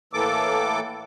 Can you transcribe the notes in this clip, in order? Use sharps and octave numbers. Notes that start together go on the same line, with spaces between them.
A2 E3 A#3 A4 D6